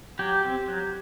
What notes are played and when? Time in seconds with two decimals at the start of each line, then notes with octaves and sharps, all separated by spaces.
0.19 F#3 G4
0.45 C4
0.68 F#3